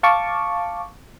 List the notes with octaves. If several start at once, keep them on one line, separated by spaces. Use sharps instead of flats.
F5 A5 C#6 D6